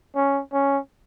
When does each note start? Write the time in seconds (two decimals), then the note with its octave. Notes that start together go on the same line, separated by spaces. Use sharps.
0.15 C#4
0.53 C#4